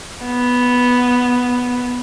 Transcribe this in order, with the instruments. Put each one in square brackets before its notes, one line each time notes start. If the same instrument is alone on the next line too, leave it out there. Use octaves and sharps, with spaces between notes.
[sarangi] B3